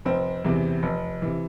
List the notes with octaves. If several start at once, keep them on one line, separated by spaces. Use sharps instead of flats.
F1 C4
E2 C3 E3
F1
C3 E3